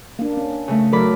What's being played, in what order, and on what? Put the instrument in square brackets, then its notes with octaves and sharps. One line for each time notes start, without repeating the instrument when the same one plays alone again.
[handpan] A#3 D4
C#4
[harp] C#3 A3
[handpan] F#3 A4 A#4 [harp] D5 B5